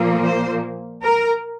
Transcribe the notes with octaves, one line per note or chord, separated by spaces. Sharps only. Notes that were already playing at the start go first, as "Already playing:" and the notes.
Already playing: A#2 F3 A#3
C5
A#4